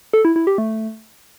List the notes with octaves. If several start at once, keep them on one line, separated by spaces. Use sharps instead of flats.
A4
E4
E4
G4
A3